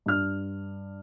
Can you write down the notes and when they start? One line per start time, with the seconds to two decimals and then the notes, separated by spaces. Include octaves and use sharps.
0.06 G2 F6